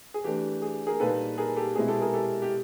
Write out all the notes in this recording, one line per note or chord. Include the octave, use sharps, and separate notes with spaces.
G#4
E3 A3 D4 G4
G#4
G#4 A#4
A#2 G3 A#3 D#4 A4 B4
G#4 A#4
G4 A4
B2 G#3 C4 E4 G#4
G4 A4
G#4 A#4
G4 A4
G4